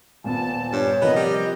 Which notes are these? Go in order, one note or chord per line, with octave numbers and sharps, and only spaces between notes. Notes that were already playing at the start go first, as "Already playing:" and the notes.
D#1 A#2 B3 A5
G2 C#5
C3 F3 A#3 B3 D#5
G3 G4